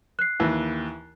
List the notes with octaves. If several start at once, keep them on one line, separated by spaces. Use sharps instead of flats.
F#6 C7
D#2 E3